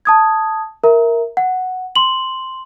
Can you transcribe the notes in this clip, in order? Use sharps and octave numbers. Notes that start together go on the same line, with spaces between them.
A5 D#6 G#6
A#4 E5 A#5
F#5
C6 F#7